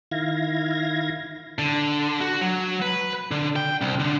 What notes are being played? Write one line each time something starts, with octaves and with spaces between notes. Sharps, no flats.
D#3 E4 F5 G#6 A#6
D3
F#4
F#3
B4
D3
G5
C2
D3